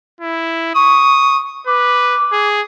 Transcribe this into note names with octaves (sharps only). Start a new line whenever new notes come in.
E4
C#6 D#6
B4 D6
G#4